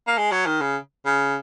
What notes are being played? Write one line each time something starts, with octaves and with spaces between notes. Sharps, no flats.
A#3
G#3
F#3
D#3
C#3
C#3